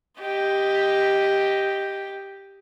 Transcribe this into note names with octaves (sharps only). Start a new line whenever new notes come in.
G4 D#5